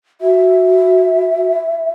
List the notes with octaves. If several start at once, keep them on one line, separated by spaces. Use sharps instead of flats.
F#4 E5